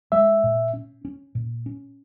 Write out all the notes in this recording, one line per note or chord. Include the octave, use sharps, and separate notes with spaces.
G#3 E5
A#2
C#4
C#4
A#2
C#4